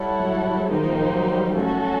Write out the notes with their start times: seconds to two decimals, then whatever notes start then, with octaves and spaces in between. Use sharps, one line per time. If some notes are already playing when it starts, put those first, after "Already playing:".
Already playing: G3 E4 A4 C#5 F#5
0.20 F#3
0.29 G3
0.42 G3
0.57 G#3
0.71 D#3 A#3 D#4 G4 C5
0.85 F3
0.99 F3
1.13 F#3
1.35 G3
1.55 A3 C#4 F#4 A4